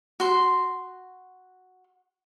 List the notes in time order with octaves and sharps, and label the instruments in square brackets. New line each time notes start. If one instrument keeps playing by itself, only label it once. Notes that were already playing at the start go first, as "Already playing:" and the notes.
[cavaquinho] F#4 C6